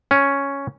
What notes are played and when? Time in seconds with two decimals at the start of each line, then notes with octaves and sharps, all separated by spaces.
0.11 C#4